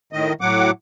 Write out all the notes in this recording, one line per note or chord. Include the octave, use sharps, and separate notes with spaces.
A2 D#3 D#5
A2 F#3 F#5 D6